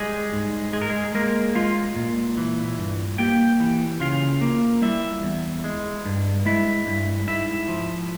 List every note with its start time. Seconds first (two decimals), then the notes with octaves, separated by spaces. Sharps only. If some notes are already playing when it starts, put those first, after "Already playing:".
Already playing: G3 G#3 G#4
0.33 G#2
0.73 G#3 G#4
0.82 A#4
0.89 G#3 G#4
1.15 G#3 A#3 A#4
1.55 G#3 F4 F5
1.96 A#2
2.37 E3
2.78 G2
3.18 A#3 G4 G5
3.60 E3
4.00 C#3 F4 F5
4.41 A#3
4.82 G3 E4 E5
5.23 E2
5.64 G#3
6.05 G2
6.45 G#3 E4 E5
6.86 G2
7.28 G#2 E4 E5
7.68 F3